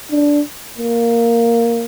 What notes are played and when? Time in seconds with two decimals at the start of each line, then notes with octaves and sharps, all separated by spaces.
0.11 D4
0.78 A#3